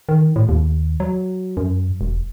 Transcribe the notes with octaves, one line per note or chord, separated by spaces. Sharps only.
D#3
A2
D#2
F#3
F#2
E1